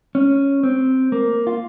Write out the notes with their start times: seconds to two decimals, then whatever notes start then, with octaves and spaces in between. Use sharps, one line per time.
0.15 C#4
0.63 C4
1.12 A#3
1.47 F4